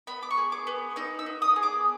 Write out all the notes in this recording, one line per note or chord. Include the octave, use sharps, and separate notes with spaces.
B3 B5
D6
C#6
G#4
D6
B3
D#4 E6
E6
B3
D#6
G#4
D6